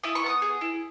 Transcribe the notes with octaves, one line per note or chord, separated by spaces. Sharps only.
E4 D#6
C#6
B3 D#6
G#4
E4